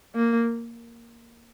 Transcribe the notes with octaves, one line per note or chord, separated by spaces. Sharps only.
A#3